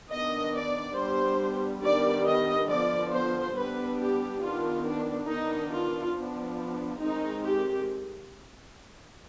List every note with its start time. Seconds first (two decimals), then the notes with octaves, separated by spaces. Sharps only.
0.10 D#3 B3 D4 D#5
0.54 D5
0.96 G3 B3 D4 C5
1.82 D#3 G3 B3 D4 D5
2.26 D#5
2.69 D3 F3 B3 D5
3.12 C5
3.55 G3 B3 D4 B4
3.98 G4
4.41 D#3 B3 D4 F4
4.84 D4
5.27 D#3 B3 D4 D#4
5.71 F4
6.14 F3 B3 D4
7.00 D#3 G#3 C4 D#4
7.44 G4